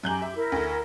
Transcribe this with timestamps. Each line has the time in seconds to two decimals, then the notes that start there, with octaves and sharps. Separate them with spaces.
0.04 F#2 G4 G#5 A#5 G6 F#7
0.22 G4 E5
0.35 E4 A#4
0.52 D2